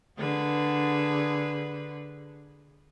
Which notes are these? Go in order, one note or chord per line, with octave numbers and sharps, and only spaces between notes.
D3 G#4 B4